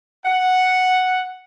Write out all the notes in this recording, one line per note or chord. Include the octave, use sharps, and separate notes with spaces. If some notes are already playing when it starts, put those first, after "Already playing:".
F#5